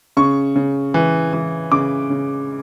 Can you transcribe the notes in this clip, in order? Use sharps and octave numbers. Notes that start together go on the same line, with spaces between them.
C#3 C#6
C#3
E3
E3
C#3 D6
C#3